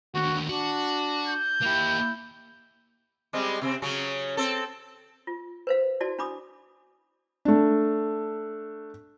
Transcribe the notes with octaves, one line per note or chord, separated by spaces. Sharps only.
D#2 D3 F#4
D4 F#4
G6
A#3 E4 G4
G3 G#3 C4
C3 C4
C#3 F#3 C#4
C4 A4
F4
B4 C5 F5
E4 F#4 D5 A5
D4 B5 D6 D#6
A3 D4